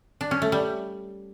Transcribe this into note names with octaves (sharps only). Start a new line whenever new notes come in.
D4
C#4
A3
G3